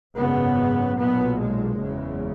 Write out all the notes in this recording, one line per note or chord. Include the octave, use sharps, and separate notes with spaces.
G#1 F#2 C#3 B3
B1 A#2 B3
G#3
F#1 E2 C#3